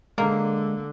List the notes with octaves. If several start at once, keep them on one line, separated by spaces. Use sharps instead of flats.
D3 G#3 A#3